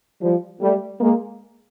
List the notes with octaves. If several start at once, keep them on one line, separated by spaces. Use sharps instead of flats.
F3 G3
G3 A3
G#3 A#3